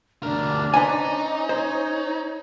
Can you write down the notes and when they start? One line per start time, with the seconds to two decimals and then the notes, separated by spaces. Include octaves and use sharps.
0.23 D2 D4 A#4
0.74 C#4 D#4 B4 C5 G#5
1.49 C5 C#5